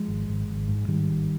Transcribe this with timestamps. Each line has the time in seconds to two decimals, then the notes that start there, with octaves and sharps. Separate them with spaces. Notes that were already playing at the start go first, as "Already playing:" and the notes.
Already playing: F3 G#3
0.08 G#1
0.28 G#1
0.48 G#1
0.68 G#2
0.88 G#2 D#3 G3
1.09 G#1